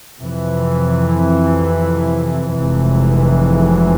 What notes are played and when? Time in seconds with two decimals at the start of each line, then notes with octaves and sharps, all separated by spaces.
0.19 F2 C3 E3
2.55 F1 F2 C3 E3 G#3